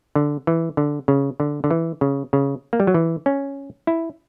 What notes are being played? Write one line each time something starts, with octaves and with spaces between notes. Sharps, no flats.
D3
E3
D3
C#3
D3
D3
E3
C#3
C#3
A#3
G3
F#3
E3
C#4
E4